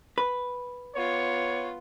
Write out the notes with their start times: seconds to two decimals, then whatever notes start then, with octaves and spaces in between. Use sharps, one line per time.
0.18 B4
0.95 B3 F4 C#5